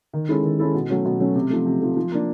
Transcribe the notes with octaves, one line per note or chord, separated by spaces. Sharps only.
D#3
G#3 C#4 E4 A4
D#3
G#3 C#4 E4 A4
B2
F#3 A3 C#4
B2
F#3 A3 C#4
C3
F3 A3
C3
F3 A3
F3
A#3 D4